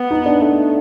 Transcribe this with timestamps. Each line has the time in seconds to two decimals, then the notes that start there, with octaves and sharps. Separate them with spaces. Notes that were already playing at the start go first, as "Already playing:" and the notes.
Already playing: B3
0.11 D#4
0.26 D4
0.41 A3